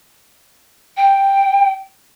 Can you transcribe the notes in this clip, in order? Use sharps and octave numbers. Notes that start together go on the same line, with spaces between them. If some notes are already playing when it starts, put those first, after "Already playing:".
G5